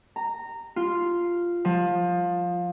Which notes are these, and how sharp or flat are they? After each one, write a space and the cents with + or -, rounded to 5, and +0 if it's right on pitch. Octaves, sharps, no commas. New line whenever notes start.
A#5 -15
F4 -5
F3 +20